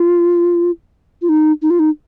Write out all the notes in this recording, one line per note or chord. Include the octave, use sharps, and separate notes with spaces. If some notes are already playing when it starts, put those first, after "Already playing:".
Already playing: F4
F4
D#4
D#4
F4
D#4